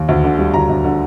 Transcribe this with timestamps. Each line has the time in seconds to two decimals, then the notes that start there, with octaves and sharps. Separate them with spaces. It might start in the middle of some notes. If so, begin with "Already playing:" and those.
Already playing: D#2
0.09 D2
0.24 D3
0.38 G3
0.54 D2 A#5
0.69 D2
0.84 D3